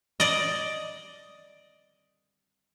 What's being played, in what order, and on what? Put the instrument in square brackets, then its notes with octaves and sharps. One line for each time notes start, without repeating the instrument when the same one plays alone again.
[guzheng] D5 D#5